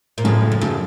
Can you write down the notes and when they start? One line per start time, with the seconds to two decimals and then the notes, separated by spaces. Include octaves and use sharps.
0.18 A#2
0.24 F#1 F#2 A2 C#3 F3
0.52 F2
0.61 F#2 C#3 F3